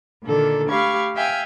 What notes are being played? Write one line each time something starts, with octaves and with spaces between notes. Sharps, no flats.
A#2 D3 D#3 A4
A3 G4 F5 B5 C#6 G#6
E5 F5 G5 G#5